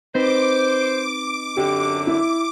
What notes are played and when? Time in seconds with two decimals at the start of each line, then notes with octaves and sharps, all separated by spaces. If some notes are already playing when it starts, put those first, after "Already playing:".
0.15 C4 D#4 B4 C5 D6
1.57 F#2 D3 G4
2.07 E4 D6